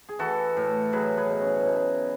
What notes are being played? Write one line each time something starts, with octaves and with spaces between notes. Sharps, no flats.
G#4
E3 F#4 A4
A2
F#3 G#4 B4
G#4 B4
B2
C#4
B2